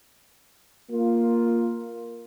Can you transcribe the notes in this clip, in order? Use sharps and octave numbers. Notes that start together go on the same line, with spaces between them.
A#3 F4